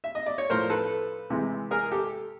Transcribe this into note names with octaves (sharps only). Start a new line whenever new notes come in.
E5
D#5
D5
C#5
A2 F3 A3 A#4 C5
A4 B4
C3 E3 G#3
G#4 A#4
G4 A4